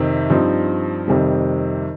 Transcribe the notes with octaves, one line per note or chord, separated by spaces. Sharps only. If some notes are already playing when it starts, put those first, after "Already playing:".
Already playing: F2 C3 D#3
G2 F3 C4 D#4
F2 C3 D#3 G3